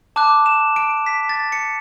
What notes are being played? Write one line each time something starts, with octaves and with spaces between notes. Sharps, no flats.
A5 D6 F#6
E7
D7
B6
A6
C#7